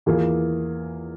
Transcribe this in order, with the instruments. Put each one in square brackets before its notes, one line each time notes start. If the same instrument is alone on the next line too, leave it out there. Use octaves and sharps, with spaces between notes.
[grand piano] E2 E3 A#3 F4 G#4